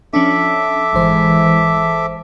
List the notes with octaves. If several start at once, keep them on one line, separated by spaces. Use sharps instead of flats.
F3 C#4 D4 A4 E5 D6
G#1 E3 G#3 C5